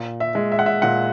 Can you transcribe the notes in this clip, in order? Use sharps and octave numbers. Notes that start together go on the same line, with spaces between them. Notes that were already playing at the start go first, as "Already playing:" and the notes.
Already playing: A#2
E5
G#3
E5
F#5
E5
A#2 F#5